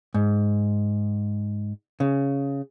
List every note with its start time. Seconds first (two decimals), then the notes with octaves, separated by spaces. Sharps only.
0.14 G#2
2.00 C#3